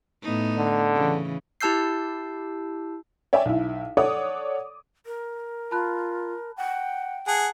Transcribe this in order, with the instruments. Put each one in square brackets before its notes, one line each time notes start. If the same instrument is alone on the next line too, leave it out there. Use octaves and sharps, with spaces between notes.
[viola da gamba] A2 B3 D#4
[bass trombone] D3
[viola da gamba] C#3 E3
[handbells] E4 G4 A5 E6 G6 C7
[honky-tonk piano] C#5 D5 E5 G5 G#5
B1 E4
A4 C#5 D5 F#5 D6 D#6
[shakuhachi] A#4
[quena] F4 [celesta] A5 B5 F#6
[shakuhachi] F#5 [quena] G5
[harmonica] G#4 F#5 [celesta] A5